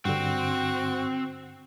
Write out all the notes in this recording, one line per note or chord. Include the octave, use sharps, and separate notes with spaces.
G2 D3 C4 F#4